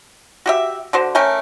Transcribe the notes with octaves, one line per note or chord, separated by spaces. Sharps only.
F#4 G4 E5
D3 F#4 C5
A3 C#4 A#4 G5